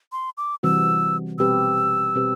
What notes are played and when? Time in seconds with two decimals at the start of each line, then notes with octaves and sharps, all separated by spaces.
0.12 C6
0.38 D6
0.63 C3 E3 G3 C4 F#4 E6
1.38 B2 G3 C4 G4 B4 E6
2.15 B2 G3 C4 G4 B4